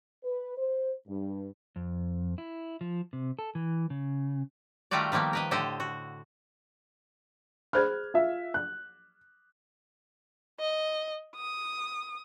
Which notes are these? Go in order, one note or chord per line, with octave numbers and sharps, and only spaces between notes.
B4
C5
G2
F2
E4
F3
C3
A4
E3
C#3
D#3 G3 A3 F4 F#4 D5
D#3 F3 G3 A#3 B3
A#4 B4 D#5
A2 D3 G4 A4 C5 D#5
F#4
G#4 C5 B5 F6 F#6 G#6
F4 E5
F#6
D#5
D#6